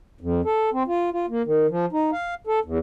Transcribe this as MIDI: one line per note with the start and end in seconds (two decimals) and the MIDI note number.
0.21 0.41 41
0.45 0.70 69
0.73 0.83 60
0.87 1.10 65
1.13 1.26 65
1.29 1.42 58
1.46 1.67 51
1.70 1.86 53
1.93 2.11 63
2.12 2.34 77
2.47 2.59 69
2.65 2.79 40